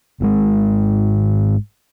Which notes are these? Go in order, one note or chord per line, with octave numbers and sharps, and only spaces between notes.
G#1 G#2 C3 G#3